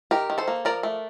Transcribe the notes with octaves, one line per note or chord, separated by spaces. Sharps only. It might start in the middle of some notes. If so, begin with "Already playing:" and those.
D#3 G4 A#4
D#3
A4 C5
A#3
F3 A#4 D5
A3